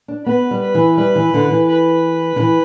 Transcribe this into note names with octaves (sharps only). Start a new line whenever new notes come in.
D4
B3 B4
G3
B4
E3
G3 B4
E3
D3
E3
B4
D3
E3